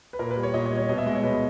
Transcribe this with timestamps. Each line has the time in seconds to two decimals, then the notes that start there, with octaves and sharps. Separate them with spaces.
0.13 B4
0.19 A#2 A#4
0.31 B4
0.37 G3
0.43 C#5
0.54 A#2 D#5
0.66 C#5
0.72 G3
0.77 C#5
0.89 B2 D#5
0.98 E5
1.06 G#3 D#5
1.15 C#5
1.23 B2 B4